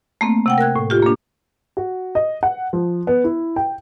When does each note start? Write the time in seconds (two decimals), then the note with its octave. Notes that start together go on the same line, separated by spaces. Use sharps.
0.21 A3 A#3 C4
0.46 C3 F#5 G5
0.58 A#4 G5 F#6 G#6
0.76 A2
0.90 F4 G4
1.03 A#3 D4
1.77 F#4
2.15 D#5
2.43 F#5
2.73 F3
3.07 B3
3.24 E4
3.56 G5